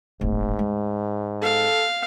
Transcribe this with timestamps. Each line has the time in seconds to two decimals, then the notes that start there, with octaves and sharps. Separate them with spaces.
0.21 D1 G1 G#2
0.59 G#3
1.42 A4 F5